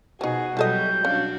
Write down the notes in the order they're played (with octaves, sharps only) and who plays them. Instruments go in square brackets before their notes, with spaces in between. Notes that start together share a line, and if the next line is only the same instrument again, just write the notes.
[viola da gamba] B2 G#4 [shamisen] F3 D#4 [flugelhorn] F#4
[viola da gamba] B2 F#3 G3 [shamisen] E4 A4 D#5 [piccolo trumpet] G6
[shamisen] C#4 [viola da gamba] D4 F#4 [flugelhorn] F5